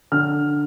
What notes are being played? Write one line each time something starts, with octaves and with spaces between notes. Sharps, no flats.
D3 F6